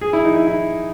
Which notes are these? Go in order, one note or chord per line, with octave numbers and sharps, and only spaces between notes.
G#4
E4
D#4
E4
E4